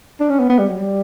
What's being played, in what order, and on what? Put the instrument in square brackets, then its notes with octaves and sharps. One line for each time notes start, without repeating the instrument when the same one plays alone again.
[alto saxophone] D4
C#4
B3
B3
G3
F#3
G3